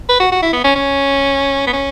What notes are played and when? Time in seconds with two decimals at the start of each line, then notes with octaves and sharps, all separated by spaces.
0.09 B4
0.20 F#4
0.32 F#4
0.43 E4
0.53 B3
0.64 C#4
0.76 C#4
1.67 B3
1.73 C#4